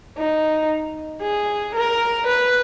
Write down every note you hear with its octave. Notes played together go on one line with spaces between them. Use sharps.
D#4
G#4
A#4
B4